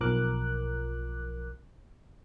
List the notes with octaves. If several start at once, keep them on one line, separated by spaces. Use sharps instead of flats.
B1 F3 A#4 D6 F#6